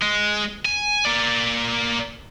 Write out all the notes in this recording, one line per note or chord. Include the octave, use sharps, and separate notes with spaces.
G#3
G#5
A#3 D5